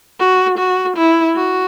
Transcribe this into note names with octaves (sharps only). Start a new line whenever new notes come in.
F#4
F#4
E4
F#4